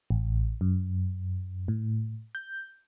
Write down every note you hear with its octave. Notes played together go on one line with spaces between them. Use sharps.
A1
F#2
A2
G6